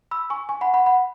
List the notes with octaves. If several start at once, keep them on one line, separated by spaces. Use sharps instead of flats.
B5 E6
G#5 C#6
G#5 C#6
F#5 B5
F#5 B5
F#5 B5